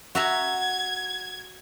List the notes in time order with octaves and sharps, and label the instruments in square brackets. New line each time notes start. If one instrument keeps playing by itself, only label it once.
[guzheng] F#4 E5 A#5 [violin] G#6